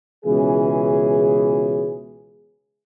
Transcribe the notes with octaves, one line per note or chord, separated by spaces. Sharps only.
C#2 B2 E3 C#4 G#4